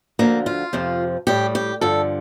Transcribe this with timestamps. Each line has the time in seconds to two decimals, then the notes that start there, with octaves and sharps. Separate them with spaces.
0.19 D2 D3 F3 A#3
0.46 F4
0.73 F2 C3 F3
1.27 A2 G3 G4
1.55 G4
1.81 G2 D3 F3 A4